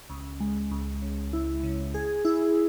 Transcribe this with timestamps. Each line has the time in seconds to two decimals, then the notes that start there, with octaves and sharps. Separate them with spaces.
0.10 C#2
0.40 G#3
0.71 C#2
1.02 C#3
1.33 E4
1.63 C#3
1.94 G#4
2.25 E4